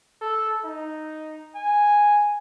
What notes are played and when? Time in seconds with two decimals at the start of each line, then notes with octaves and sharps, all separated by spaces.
0.21 A4
0.64 D#4
1.55 G#5